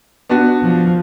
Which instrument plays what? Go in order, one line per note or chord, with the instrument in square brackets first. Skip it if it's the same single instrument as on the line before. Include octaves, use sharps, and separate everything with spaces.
[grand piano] B3 D4 F#4
[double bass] F3